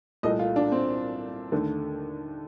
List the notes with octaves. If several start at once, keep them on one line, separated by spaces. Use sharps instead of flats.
C2 A#2 A3 D#5
F4
D4
C4
D#2 D3 A3